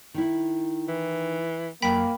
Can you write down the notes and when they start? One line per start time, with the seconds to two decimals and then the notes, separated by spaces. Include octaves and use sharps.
0.14 D#3 E4
0.88 E3
1.82 F#2 A#3 G5 B5 B6